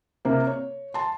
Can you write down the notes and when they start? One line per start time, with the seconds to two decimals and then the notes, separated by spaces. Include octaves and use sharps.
0.25 C3 A#3 A#4
0.47 C#5
0.94 A5 C6